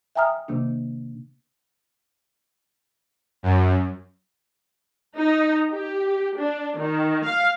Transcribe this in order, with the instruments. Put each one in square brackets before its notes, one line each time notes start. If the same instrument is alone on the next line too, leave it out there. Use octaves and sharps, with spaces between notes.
[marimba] E5 G5 G#5 A#5 D#6 F6
C3 D#3 A#3 D4
[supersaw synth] F#2
[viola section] D#4
G4
D4
D#3
F5